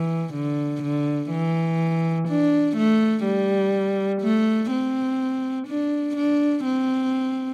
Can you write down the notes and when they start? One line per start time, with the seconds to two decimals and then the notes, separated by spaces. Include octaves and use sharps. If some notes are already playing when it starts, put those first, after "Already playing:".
Already playing: E3
0.34 D3
0.83 D3
1.31 E3
2.28 D4
2.76 A3
3.25 G3
4.22 A3
4.71 C4
5.68 D4
6.16 D4
6.65 C4